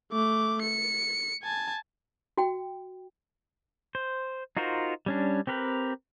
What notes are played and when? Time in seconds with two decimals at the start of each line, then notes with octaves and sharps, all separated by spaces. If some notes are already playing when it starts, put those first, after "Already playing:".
0.12 A3 D6
0.62 C#7
1.43 G#5 A5
2.38 F#4 G5
3.95 C5
4.57 D#4 F4 F#4 A#4 C5
5.06 G3 C#4 D4
5.47 C4 G4 A#4 B4